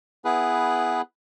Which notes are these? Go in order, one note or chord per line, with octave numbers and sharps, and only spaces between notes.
B3 E4 G#4 B4